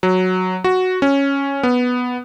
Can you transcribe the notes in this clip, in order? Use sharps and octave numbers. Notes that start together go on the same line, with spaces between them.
F#3
F#4
C#4
B3